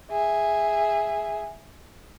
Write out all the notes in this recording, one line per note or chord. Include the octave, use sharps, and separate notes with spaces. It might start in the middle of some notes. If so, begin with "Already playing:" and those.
G#4 E5